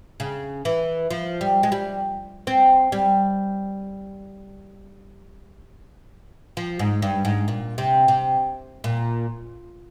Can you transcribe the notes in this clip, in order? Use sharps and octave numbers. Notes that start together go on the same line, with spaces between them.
C#3
E3
F3
G3
G#3
G3
C4
G3
F3
G#2
G2
G#2
A#2
C3
C3
A#2